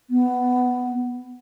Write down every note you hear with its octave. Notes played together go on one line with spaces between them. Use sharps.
B3